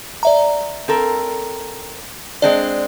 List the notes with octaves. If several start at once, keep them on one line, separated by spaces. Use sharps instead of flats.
D5 E5 A#5
C4 A4 A#4
G#3 C4 D4 D5